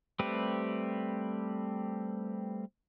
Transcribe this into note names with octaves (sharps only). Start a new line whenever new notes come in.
G3 A3 C4 G4 B4